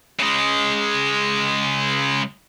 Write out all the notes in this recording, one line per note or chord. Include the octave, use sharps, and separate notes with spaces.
C#3 G#3